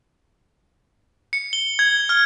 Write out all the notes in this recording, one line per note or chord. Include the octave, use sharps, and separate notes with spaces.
C#7
G7
G#6
F6